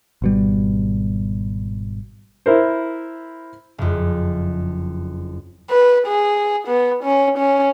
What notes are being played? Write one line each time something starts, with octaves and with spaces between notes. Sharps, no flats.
G#1 B2 G3
E4 A#4 C5
F#1 F2
B4
G#4
B3
C#4
C#4